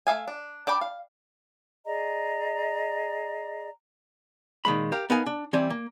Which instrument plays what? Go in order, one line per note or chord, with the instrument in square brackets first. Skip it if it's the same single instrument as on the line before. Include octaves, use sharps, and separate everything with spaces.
[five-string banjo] A3 E5 F5 G#5
D4
D4 D5 G5 B5
F5
[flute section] G#4 D5 D#5 A#5
[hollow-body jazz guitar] A#2 D#3 G#3 B5
G4 A#4 F5
B3 D#4 A#4 F5 G#5
D4
E3 G3 C4 D5 G#5
A#3